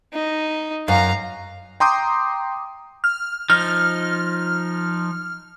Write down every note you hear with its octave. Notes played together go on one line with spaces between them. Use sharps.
D#4
F#2 F5 A#5
G5 A#5 C6 D6 D#6 G6
F6
F3 D#4 F6